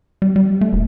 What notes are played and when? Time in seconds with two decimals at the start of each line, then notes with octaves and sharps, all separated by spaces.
0.22 G3
0.36 G3
0.61 A3
0.73 D#1